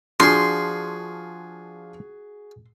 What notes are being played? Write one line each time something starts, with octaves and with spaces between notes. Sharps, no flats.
F3 D4 F4 F#4 G#4 C6